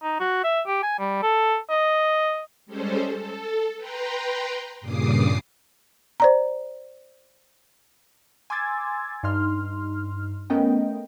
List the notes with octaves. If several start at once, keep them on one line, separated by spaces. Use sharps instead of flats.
D#4
F#4
E5
G4
G#5
G3
A4
D#5
G3 G#3 C#4 A4 C5
A4
B4 G5 A#5 C6
G2 A#2 C#3 D6 D#6 C7
C5 D5 A#5
G#5 C6 D6 E6 G#6 A6
G2 D#4 C6 F6
A3 B3 C#4 A#4 D#5 G5